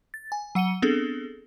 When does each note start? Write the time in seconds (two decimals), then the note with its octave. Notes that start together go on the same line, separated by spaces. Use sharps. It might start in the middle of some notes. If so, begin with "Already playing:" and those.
0.14 A6
0.32 G#5
0.55 F#3 F#5 C#7 D#7 G7
0.82 B3 C4 D4 G#4 A4